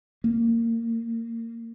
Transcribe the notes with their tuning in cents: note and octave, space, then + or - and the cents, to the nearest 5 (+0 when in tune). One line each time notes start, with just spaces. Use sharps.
A#3 -25